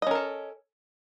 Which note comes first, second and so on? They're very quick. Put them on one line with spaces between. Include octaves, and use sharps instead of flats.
D#5 C#4 A#4 A4